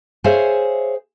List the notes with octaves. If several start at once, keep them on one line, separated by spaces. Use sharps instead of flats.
G#4 C5 C#5 E5 F5 G#5